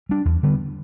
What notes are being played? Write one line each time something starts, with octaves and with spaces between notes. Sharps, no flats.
G3 D4
E2
D3 G3 B3